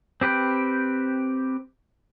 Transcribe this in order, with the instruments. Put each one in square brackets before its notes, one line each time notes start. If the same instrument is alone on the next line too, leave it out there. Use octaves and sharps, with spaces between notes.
[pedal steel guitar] C4 G4 B4 G5